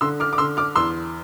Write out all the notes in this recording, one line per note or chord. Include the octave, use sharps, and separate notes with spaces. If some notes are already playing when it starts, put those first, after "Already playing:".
D3 C6 E6
D6 F6
D6
D3 C6 E6
D6 F6
E2 C6 E6